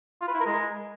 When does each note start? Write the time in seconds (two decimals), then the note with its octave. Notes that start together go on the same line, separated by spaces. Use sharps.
0.21 F4
0.28 B4
0.34 E4
0.40 A#4
0.46 G#3